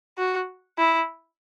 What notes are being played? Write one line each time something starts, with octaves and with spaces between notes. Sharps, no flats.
F#4
E4